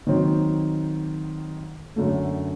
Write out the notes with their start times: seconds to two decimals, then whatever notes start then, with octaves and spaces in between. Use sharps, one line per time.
0.07 D#3 F#3 C4
1.96 F#2 D3 A3